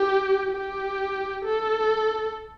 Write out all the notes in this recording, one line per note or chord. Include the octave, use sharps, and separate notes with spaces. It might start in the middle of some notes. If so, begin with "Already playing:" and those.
Already playing: G4
G4
A4